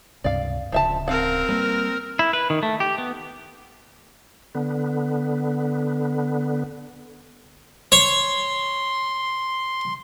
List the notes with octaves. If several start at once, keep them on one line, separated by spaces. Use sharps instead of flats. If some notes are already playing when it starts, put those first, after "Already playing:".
C#2 G2 C3 D5 F5
D1 C#3 F3 E5 A5
C4 A#4 F5 F#5
G3 A3 A#3 B4
E4
B4
D#3
A3
G4
B3
D3 B3
C#5 C6